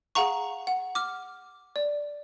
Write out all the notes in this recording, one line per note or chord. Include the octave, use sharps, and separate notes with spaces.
G#4 F5 F#5 A#5 C#6
F#5
D6 F6
D5